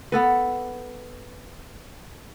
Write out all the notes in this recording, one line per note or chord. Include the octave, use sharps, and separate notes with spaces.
B3 A4 B4